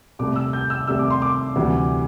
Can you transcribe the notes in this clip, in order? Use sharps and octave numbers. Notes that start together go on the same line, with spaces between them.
C2 C3 A3 D6
E6
G6
E6
C2 C3 A3 E6
D6
C6
D6
D2 C3 E3 G3